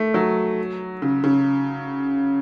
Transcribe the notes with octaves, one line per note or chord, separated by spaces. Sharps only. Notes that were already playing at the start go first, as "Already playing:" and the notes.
Already playing: A3
F#3
C#3
C#3